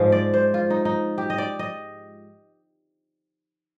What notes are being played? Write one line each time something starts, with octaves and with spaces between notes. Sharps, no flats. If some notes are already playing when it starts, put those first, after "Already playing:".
Already playing: G#2 F3 G#3 F5
D5
C5
F4
D#4
D#4
G4
D#5
D5
D#5